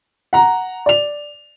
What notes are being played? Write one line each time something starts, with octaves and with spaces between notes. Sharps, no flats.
F#5 A#5
D5 F7